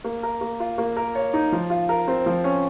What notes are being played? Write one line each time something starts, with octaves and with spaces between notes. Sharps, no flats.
A#3
A#4
A#3
F4
A#3
A#4
C#5
D#4
F3
F4
A#4
C4
F3
C#4